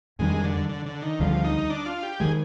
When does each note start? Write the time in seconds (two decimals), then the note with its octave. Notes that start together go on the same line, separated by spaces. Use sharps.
0.19 F2 D#3 G3 G#3 D4
0.44 D3
0.69 D3
0.86 D3
1.02 D#3
1.19 D2 D3 F3 G3
1.44 D#4
1.70 D4
1.86 F4
2.03 G4
2.20 D#3 G#3 G#4